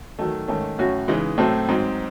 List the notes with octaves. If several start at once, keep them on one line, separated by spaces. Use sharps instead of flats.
D#3 F#3 A3
G#2 D#3 A3 C#4
A2 F#3 C#4 F#4
C#3 E3 G#3 D#4
A2 F#3 A3 C4
G#2 F#3 C4 D#4